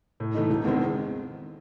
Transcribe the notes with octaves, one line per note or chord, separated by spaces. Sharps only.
A2
E3 A3 D#4
E1
E2 D#3 G#3 C4